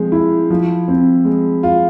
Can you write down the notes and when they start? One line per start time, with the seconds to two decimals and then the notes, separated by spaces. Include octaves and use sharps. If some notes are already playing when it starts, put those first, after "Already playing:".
Already playing: F3 G#3 C4
0.12 E4
0.50 F3
0.88 C4
1.25 G#3
1.63 F4